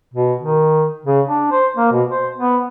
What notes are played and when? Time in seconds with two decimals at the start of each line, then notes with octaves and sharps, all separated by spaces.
0.14 B2
0.39 D#3
1.06 C#3
1.28 D4
1.52 C5
1.77 A#3
1.92 B2
2.10 C5
2.38 B3